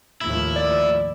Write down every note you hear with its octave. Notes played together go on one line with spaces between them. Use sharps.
D#2 A2 F3 E4
D5